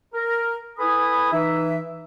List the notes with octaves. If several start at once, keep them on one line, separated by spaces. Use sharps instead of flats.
A#4
E4 A4 B4 G#5 B5 D#6
E3 D#4 E5